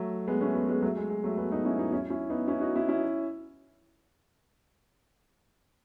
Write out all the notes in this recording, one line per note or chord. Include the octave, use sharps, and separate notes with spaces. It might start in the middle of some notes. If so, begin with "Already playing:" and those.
Already playing: F#3 A3
G#3 B3
A3 C#4
G#3 B3
G#3 B3
F#3 A3
G#3
G#3
F#3 A3
G#3 B3
B3 D#4
C#4 E4
B3 D#4
C#4 E4
C#4 E4
B3 D#4
C#4 E4
D#4 F#4
C#4 E4
C#4 E4